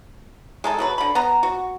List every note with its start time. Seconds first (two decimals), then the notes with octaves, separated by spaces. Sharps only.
0.64 G#3 D#4 A4
0.78 B2 F#3 B4
0.98 D3 B5
1.15 B3 A#5
1.43 F#4